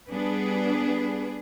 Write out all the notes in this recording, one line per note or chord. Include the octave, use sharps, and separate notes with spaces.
G3 B3 D4 G#4 B4